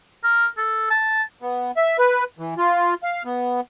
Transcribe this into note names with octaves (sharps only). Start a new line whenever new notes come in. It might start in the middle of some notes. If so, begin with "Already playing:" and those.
A#4
A4
A5
B3
E5
B4
E3
F4
F5
B3